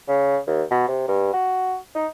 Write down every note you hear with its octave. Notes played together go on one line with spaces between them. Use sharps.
C#3
D#2
B2
C3
G2
F#4
D#4